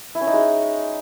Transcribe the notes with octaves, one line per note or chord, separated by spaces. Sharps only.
E4
C#4
D#4
G#3